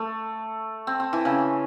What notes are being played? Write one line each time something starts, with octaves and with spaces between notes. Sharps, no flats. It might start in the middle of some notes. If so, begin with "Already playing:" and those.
Already playing: A3
C4
C4
E3
C#3